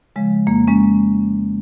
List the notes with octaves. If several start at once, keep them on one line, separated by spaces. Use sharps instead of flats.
C#3 F3 G#3
F2 A#3
G#3 C#4